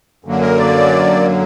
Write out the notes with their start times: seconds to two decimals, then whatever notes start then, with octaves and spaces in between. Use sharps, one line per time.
0.25 F#2 D3 F#3 A#3
0.41 A#4
0.58 D5